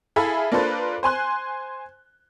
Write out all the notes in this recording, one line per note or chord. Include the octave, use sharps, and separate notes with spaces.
E4 G#4 A4 E5 F5 B5
A#3 D4 F4 A4 B4 C5
C5 G#5 C6 F#6